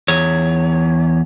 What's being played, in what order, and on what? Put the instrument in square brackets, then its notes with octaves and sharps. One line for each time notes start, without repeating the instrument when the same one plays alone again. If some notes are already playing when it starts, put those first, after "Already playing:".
[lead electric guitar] E2 C#5